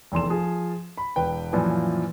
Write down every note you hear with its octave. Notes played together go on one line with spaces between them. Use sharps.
F1 E2 C6 E7
F3 G#4
B5
E1 B4 G5
F#2 A#2 E3 F3